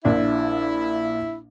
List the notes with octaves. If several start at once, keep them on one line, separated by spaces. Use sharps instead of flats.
A#1 A#2 D4 E4